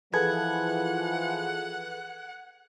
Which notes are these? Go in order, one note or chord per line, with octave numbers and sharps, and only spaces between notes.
E3 F3 G#4 A4 B4 F#5 G#6